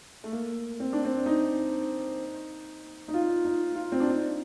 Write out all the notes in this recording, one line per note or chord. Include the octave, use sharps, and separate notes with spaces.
A3
A#3
C4
D4
C4
D#4
D#4
F4
D#4
F4
C4
D4
D#4